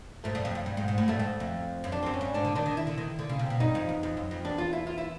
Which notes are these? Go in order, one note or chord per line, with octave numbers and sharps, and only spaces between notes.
G#2 A3
G2
F2
F#2
G2
G#2
G#2
A2
G2 A3
G#2
F2
F#2
F2 D4
F#2 C4
C#4
G2
G#2 D4
D3
D#3 D4
D#3
E4
D3
D#3
D3
C#3
C3
B2
G2 D#4
F2
E2
F2
F#2
F2
E2 D4
F4
E4
F4
E4